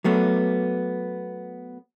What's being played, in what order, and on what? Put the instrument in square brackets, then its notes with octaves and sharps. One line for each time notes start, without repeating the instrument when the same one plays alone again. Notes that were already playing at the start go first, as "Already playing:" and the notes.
[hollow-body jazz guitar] F#3 A3 B3